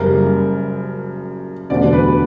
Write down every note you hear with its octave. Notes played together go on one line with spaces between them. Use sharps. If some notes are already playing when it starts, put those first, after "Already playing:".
Already playing: F#1 F#2 C#3 G3 A#4
E1 D2 D3 F#3 D5
B4